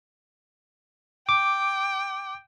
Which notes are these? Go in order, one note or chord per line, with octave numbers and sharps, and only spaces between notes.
G5 D6